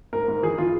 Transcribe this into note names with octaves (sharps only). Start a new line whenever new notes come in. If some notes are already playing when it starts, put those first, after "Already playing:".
G#2 A#4
G#2
E3 G#4
E3 F4